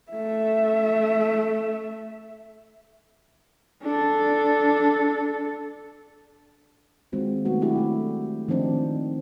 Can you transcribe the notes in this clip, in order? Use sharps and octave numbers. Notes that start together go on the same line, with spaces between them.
A3 E5
D4 A4
D#3 G#3 C4 F4 F#4
D#3 F#3 A3 B3 F#4
D4 E4 F#4 G4
A3 D4 F#4
D#3 F3 A3 C4 D4 D#4